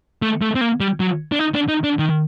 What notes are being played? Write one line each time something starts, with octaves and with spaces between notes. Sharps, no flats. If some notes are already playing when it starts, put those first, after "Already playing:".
A3
A3
C4
A#3
G3
F#3
D4
D#4
D4
D#4
D4
D#3